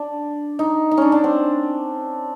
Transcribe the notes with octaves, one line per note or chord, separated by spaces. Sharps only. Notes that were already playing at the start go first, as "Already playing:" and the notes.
Already playing: D4
D#4
D#4
C#4 D4
D4
C4